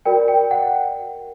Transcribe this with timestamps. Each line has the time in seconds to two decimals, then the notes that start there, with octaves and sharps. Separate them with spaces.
0.05 F#4 A#4 D5 G5
0.28 G5
0.51 F#5